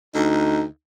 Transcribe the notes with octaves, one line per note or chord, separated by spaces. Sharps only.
D2 D#4